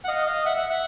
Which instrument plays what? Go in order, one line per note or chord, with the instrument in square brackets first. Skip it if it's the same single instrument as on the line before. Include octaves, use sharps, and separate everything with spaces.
[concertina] F#5
D#5 F5
D#5 F5
E5 F#5
E5 F#5
E5 F#5